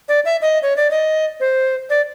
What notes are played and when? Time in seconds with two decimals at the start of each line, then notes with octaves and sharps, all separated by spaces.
0.09 D5
0.25 E5
0.42 D#5
0.63 C#5
0.76 D5
0.91 D#5
1.40 C5
1.90 D5